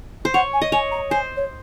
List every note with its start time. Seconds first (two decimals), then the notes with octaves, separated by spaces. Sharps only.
0.25 C5
0.34 C#5 F#5
0.53 G#5
0.62 D#5
0.72 C#5 G#5
0.91 A#5
1.11 C5 G#5
1.36 C#5